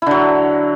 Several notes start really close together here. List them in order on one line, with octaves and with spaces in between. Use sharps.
E4 D3 F#3